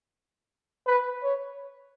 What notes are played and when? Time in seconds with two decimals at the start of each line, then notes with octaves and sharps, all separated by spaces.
0.86 B4
1.23 C#5